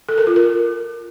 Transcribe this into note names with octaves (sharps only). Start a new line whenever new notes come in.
A4
A#4
F4
A#4